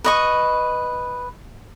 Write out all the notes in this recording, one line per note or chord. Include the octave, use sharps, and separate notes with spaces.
B4 D#5 C#6